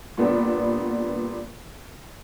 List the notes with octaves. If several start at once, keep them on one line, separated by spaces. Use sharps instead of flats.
A#2 G3 B3 D4